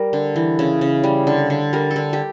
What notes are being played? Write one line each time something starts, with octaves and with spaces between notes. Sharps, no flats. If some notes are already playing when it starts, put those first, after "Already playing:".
Already playing: G3 A#4
D3
E3
C#3
C#3
G3
D3
D3
G3 A#4
A4
D3
G4